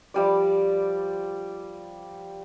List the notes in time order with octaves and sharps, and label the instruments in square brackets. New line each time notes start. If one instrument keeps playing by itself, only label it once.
[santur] F3 G3 D5